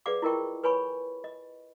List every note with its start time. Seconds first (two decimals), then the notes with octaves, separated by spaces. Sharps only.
0.06 G#4 B4 D5 F5 F#5 D6
0.22 E4 F4 A#4 D#5 G5 C#6
0.64 B4 C#5 G#5 B5 C#6
1.24 D#5